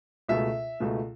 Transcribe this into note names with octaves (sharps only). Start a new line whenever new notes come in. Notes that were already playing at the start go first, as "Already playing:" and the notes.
C#2 B2 A3 E5
C#2 B2 A3